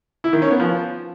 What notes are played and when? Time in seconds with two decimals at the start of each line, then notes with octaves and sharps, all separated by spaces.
0.24 E4
0.33 D#3
0.42 C#4
0.51 B3
0.60 F3